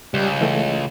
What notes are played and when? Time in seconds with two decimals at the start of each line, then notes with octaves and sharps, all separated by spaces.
0.14 C#2 G3
0.41 E3 A3